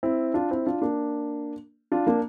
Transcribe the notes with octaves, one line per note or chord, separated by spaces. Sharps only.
C4 E4
D4 F4
C4 E4
D4 F4
A#3 D4
D4 F4
A#3 D4